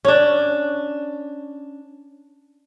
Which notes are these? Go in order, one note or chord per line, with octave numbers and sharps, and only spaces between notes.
C#4 D4